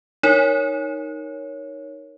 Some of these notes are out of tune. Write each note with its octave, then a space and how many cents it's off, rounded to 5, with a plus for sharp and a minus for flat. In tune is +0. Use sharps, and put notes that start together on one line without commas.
D#4 +0 A#4 +0 C#5 +0